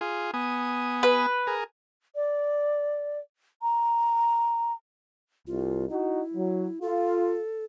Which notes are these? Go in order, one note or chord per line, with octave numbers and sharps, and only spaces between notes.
F4 G#4
B3 G#5 D#6
B4
G#4 A#4
D5
A#5
C2 F4
D#4 E4 F#4
F#3
F4 A4